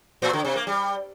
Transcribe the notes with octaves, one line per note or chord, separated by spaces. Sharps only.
A2
D3
C3
A#3
G3